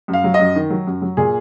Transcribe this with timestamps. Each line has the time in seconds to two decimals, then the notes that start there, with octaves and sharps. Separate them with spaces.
0.08 F#2
0.13 F5
0.24 F#3
0.34 D#5
0.39 F#2
0.56 D#3
0.70 F#3
0.87 F#2
1.02 F#3
1.17 A#2 G#4